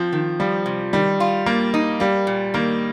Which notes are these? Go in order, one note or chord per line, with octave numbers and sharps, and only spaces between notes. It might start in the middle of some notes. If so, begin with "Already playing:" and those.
Already playing: F3 C4
D#3
F3 G3
C3
D#3 G3
F4
G3 A#3
D#4
G3 A#3
A#2
D#3 A#3